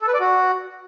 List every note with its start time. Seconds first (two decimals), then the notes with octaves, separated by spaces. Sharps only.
0.01 A4
0.07 B4
0.14 D5
0.20 F#4